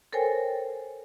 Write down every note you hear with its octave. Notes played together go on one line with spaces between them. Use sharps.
A4 A#4 C5 C#5 G5 G#5